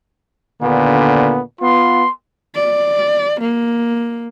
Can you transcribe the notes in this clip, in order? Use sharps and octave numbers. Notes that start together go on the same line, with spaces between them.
D#2 A#2 D3 B3
B3 F4 C6
D5
A#3